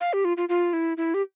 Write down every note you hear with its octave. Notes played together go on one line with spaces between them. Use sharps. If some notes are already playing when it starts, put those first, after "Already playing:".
F5
G4
F4
F4
F4
E4
E4
G4